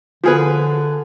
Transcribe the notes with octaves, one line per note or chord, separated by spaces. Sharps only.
D3 F3 G#4 B4